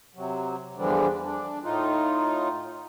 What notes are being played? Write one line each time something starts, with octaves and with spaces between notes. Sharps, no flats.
C3 F#3
E2 D3 E3 F3 G3 D4
D4
A2 D#4 F4